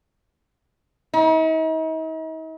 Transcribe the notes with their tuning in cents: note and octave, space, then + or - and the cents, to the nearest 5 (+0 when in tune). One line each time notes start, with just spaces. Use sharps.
D#4 +45